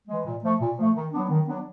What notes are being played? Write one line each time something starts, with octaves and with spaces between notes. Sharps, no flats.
E3 G#3
A#2
F3 A3
A#2
F3 A3
D#3
F#3 B3 D4
D#3
F#3 B3 D4